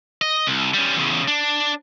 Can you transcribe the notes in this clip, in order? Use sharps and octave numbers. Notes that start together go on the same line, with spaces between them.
D#5
C2
G3 C#4
E2 C#3
D4